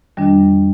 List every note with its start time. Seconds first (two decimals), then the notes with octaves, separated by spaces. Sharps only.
0.17 F2 D#3 G3 D4